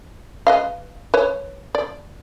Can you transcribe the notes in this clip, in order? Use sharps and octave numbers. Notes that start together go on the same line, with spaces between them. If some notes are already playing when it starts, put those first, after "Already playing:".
B4 D#5 F5
B4 C#5
D5